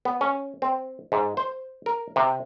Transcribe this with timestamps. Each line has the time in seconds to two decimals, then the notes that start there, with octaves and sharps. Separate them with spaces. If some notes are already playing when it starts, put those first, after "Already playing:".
0.05 B3
0.21 C#4
0.62 C4
1.12 G#2
1.37 C5
1.86 A#4
2.16 C3